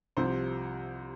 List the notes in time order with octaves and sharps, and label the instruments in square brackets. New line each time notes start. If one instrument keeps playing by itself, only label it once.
[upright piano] C2 C3 F3 C5